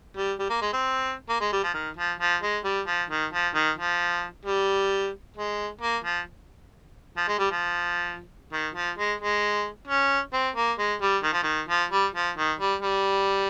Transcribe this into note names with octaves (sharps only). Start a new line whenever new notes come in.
G3
G3
A#3
G#3
C4
A#3
G#3
G3
F3
D#3
F3
F3
G#3
G3
F3
D#3
F3
D#3
F3
G3
G#3
A#3
F3
F3
G#3
G3
F3
D#3
F3
G#3
G#3
C#4
C4
A#3
G#3
G3
D#3
F3
D#3
F3
G3
F3
D#3
G3
G3